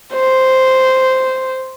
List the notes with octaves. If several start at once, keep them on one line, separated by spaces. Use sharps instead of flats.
C5